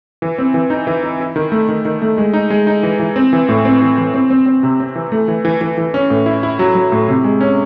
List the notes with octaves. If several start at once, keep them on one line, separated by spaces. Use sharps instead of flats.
E3
C4
E3
D#4
E3
D#4
E4
D#3
A3
D#3
D#3
A3
G#3
D#4
G#3
D#4
E3
E3
C4
E3
A2
C4
E3
E3
C4
C4
C4
C3
C4
E3
A3
E3
E3
E3
E3
C#4
A2
E4
E4
F#3
F#3
A2
C3
G#3
C#4